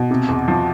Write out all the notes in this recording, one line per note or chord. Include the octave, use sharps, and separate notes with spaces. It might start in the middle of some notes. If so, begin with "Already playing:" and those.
Already playing: B2
C3
E2
F3